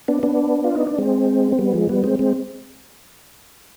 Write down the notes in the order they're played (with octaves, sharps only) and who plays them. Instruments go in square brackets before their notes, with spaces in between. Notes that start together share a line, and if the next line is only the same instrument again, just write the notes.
[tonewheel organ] B3 D4
B3 D4
F4
D#4
D4
G#3 C4
C4
G3 B3
F3 G#3
G3 B3
G#3 C4
G#3 C4